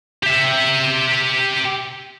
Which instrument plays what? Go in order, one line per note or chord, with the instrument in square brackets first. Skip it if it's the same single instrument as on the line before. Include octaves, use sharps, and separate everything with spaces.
[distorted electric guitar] G4 E5